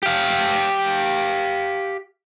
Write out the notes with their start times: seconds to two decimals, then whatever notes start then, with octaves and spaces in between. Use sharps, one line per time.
0.03 G4 F5